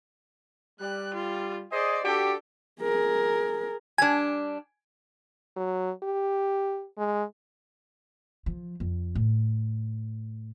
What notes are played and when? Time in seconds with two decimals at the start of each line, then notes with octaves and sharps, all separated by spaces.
0.80 G3 F#6
1.14 F4
1.72 G#4 C5 D5 D#5
2.04 D4 F#4 G4 A4
2.81 G#4 A#4
3.98 G3 D4 G#5
5.57 F#3
6.03 G4
6.98 G#3
8.46 F3
8.80 F2
9.16 A2